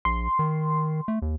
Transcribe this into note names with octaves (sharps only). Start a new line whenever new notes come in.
A#1 C6
D#3
A3
D#2